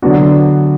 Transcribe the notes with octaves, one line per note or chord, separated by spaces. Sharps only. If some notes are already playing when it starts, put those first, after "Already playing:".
D3 F#3 B3 D4 F#4